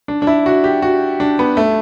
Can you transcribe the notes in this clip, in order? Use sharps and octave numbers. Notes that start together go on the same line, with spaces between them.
D4
D4
E4
F#4
G4
F#4
D4
B3
A3